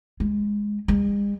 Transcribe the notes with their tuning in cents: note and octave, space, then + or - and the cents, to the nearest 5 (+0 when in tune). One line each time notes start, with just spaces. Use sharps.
G#3 -5
G#3 -45